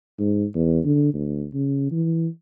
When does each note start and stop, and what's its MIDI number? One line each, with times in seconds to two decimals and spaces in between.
0.19 0.45 44
0.55 0.79 40
0.85 1.13 50
1.14 1.46 38
1.54 1.88 49
1.91 2.27 52